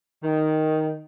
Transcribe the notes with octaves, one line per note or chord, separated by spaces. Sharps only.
D#3